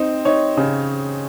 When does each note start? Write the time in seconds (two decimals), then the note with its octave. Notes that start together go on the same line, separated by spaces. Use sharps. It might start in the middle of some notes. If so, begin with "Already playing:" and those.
Already playing: C4 D#4
0.25 D#4 C#5
0.57 C#3